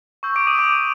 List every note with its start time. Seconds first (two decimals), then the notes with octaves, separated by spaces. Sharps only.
0.23 C#6 E6 G6
0.36 D6 D7
0.47 D#6 D#7
0.59 D6 D7